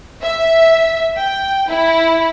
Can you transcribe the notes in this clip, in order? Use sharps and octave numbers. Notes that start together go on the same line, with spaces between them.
E5
G5
E4